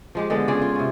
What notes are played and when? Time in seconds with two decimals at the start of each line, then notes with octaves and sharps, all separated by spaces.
0.15 F3 G#3 G4
0.30 D3 G#3 B3
0.48 C#3 F4 G#4 D5
0.62 F4
0.75 C3 C#4